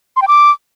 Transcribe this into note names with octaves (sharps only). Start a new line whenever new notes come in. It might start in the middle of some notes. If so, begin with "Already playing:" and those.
C6
G5
D6